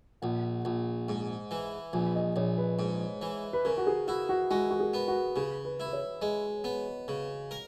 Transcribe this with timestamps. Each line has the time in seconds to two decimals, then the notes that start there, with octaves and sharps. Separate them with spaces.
0.22 A#1 F#5
0.65 A#1
1.09 G#2
1.51 E3
1.93 A#1 G#5
2.15 D#5
2.36 A#1 C#5
2.58 B4
2.79 G#2
3.22 E3
3.53 B4
3.65 C#3 A#4
3.77 F#4
3.87 G#4
4.07 E4 F#4
4.29 F#4
4.51 G#3 F#4
4.70 F#4
4.80 G#4
4.93 B3
5.08 F#4
5.36 C#3 G#4
5.65 B4
5.80 E4
5.86 B4
5.93 C#5
6.22 G#3 D#5
6.64 B3
7.08 C#3
7.51 A#4